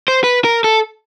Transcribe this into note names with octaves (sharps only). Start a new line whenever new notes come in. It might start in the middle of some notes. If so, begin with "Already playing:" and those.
C5
B4
A#4
A4